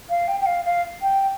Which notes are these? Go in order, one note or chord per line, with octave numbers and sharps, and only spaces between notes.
F5
G5
G5
F5
F5
G5